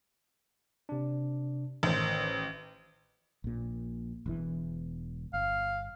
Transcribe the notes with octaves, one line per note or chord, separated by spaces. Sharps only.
C3 D4
A1 D#3 C5
A#1 A#2
E1 E2 E3
G1 F5